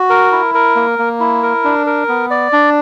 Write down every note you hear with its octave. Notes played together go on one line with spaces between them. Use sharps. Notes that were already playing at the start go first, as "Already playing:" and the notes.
Already playing: F#4
A#4
E4
A#4
A#3
A#3
E4
A#4
D4
A#4
B3
D5
D4